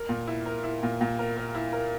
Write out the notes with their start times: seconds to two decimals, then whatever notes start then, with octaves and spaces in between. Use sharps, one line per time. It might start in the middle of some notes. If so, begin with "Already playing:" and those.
Already playing: A#4
0.09 A#2
0.27 E4
0.46 A#4
0.64 E4
0.83 A#2
1.01 A#2
1.19 A#4
1.37 A#4
1.55 E4
1.73 A#4